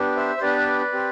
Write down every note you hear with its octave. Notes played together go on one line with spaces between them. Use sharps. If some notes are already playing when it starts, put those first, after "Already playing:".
Already playing: B3 D4 G4
C5 E5
C5
B3 D4 G4 B4 D5
C4 G4